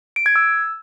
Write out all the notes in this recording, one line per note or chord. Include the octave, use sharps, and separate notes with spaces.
D7
G#6
E6